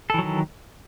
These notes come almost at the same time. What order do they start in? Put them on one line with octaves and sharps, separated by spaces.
A4 E3 F#3 D#3